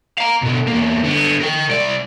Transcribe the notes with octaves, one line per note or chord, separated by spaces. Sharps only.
F5 A#5
B2 D3
E2 A#3
D3 B3
A#4 G5
C2 D5